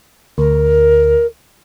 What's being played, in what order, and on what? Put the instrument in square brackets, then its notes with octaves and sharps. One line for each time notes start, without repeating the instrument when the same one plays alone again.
[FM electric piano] D2 [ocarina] A#4